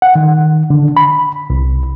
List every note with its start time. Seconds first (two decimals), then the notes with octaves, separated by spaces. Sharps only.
0.02 F#5
0.15 D#3
0.70 D3
0.97 B5
1.50 C2